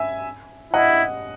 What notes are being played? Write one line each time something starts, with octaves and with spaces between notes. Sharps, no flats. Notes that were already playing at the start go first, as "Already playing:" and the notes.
Already playing: E5 G#5
E4 D#5 F#5